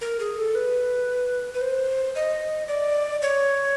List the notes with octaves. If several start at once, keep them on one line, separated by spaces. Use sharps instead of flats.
A#4
G#4
A4
B4
B4
C5
D#5
D5
C#5